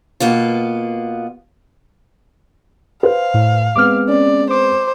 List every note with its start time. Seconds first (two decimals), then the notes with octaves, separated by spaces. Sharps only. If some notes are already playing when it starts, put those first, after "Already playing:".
0.20 B2 A#3 B3 F4
3.03 B4 C5 F5
3.34 A2
3.76 G#3 B3 C4 D6 F6
4.09 C#4 D5
4.51 C5 D6